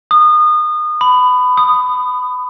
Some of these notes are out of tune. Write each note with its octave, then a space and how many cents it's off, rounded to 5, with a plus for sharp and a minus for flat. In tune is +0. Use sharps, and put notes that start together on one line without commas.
D#6 -30
B5 +20
D#6 -10